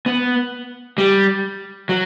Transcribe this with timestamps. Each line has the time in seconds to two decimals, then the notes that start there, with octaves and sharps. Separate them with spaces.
0.06 B3
0.98 G3
1.89 F#3